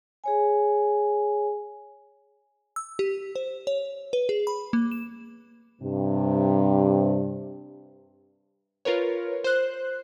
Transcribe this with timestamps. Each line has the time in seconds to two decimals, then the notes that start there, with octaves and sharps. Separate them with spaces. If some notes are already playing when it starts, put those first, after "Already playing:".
0.24 G#4 C#5 G#5
2.76 E6
2.99 G4
3.36 C5
3.67 C#5
4.13 B4
4.29 G#4
4.47 B5
4.73 A#3
4.92 E7
5.82 G2 C3
8.85 F4 A#4 B4 C#5
9.44 C5 F#6